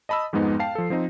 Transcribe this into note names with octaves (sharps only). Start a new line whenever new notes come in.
D#5 A5 B5 D#6 E6
F2 G#2 G#3 B3 D#4
F5 G5 A5 C7
F3 A4
F3 C4 D#4